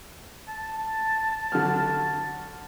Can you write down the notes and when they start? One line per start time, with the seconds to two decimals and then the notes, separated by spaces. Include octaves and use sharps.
0.48 A5
1.52 D3 F#3 F6